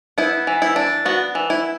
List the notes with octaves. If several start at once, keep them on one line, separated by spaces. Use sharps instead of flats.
B3 E4
E3
E4
D4
B3 F#4
E3
E4